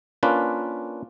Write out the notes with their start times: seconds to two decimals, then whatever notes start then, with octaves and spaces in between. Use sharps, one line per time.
0.23 A#3 C#4 D4 F4 B4